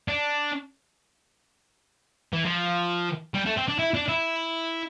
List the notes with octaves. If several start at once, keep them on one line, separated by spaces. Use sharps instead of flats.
D4
E3
F3
G3
A3
C4
D4
E4
D4
E4